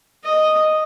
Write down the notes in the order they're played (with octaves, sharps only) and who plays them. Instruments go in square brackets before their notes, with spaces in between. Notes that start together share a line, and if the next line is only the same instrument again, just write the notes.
[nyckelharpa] D#5